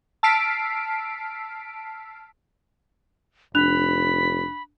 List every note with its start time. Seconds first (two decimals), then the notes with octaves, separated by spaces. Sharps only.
0.23 A5 E6 F6 B6 C7 D7
3.55 F1 D4 B5 F#6 F7